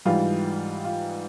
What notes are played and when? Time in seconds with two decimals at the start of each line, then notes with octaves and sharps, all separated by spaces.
0.05 G#2 E3 G3 F4
0.85 F4